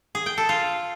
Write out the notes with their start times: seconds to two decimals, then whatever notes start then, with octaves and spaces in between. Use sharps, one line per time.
0.15 G#4
0.26 G5
0.38 A4
0.49 F4